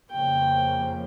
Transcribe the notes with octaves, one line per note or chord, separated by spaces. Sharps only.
F2 C#3 F3 A#3 G5